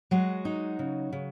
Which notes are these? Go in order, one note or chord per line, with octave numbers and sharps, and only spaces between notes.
F#3 G#3 F#4
D#4
C#3
C#3